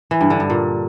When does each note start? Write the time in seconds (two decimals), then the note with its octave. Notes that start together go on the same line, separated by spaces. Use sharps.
0.11 E3
0.21 G2
0.30 D3
0.40 G2
0.50 A#2